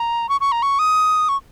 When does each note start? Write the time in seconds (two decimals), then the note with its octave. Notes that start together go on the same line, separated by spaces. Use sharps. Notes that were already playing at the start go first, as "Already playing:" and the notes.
Already playing: A#5
0.29 C#6
0.41 C#6
0.52 A#5
0.62 C#6
0.79 D#6
1.29 C#6